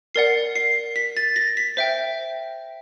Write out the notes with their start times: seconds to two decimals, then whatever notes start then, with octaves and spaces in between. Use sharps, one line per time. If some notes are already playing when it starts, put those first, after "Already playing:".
0.15 A#4 D5 F#5 C7
0.55 C7
0.96 B6
1.17 A6
1.36 A#6
1.57 B6
1.77 C5 E5 G5